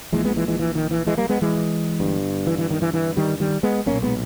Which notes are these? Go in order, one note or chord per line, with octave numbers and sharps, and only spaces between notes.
A#1 A#2 E3 G#3
G#3 B3
E3 G#3
E3 G#3
E3
D#3
E3
E3 G#3
G3 A#3
G#3 B3
E3 G#3
G1 G2
E3
E3
D#3
E3
E3
D#3 G3
D#3 G3
G#3 B3
B1 A#2 A#3 C#4
G#3 B3